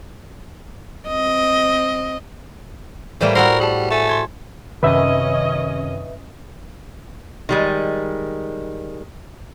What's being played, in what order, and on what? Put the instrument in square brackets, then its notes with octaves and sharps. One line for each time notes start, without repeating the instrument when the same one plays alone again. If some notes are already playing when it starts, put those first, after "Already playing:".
[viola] C4 D#5
[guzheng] A2 G3 A#3 [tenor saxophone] E3 [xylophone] C5 G6
[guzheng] F#4 A4 C6 [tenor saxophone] A#4 [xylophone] C5 F#5 B5
[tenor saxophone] G3 [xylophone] G#4 A5
[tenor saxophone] A3 [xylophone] G#5 A5
[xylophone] C6 G#6
[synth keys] F#2 C3 D#3 [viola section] C#4 D#5 [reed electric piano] B4 E5
[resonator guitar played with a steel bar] D#3 G3 G#3